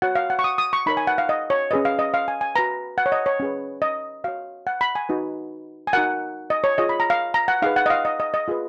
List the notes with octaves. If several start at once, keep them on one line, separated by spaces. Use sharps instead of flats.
F#4 C#5 F#5
F5
F#5
C#6
D#6
D#6
C#6
D#4 A#4 C#5 B5
G#5
F#5
F5
D#5
C#5
C#4 G#4 B4 D#5
F5
D#5
F5
G#5
G#5
F#4 B4 A#5
F#5
C#5
D#5
C#5
C#4 G#4 B4
D#5
F#4 C#5 F5
F#5
B5
G#5
D#4 F#4 B4
G#5
D#4 F#4 A#4 F#5
D#5
C#5
F4 G#4 C#5 D#5
B5
A#5
F5
A#5
F#5
D#4 G#4 B4 F5
F#5
D#5
F5
D#5
D#5
D#5
F4 G#4 B4